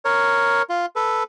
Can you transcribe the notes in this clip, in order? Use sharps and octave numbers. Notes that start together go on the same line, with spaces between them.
A#4 C#5
F4
A4 B4